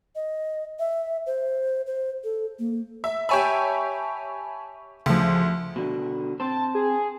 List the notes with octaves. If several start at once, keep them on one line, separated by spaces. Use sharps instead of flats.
D#5
E5
C5
C5
A4
A#3
E5
G4 C#5 E5 G#5 A5 B5
D2 C#3 F3
B2 D3
C4 C5 A5
G#4